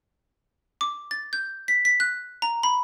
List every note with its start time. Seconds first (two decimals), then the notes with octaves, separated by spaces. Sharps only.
0.81 D6
1.11 A6
1.33 G6
1.68 B6
1.85 B6
2.00 F#6
2.42 A#5
2.63 B5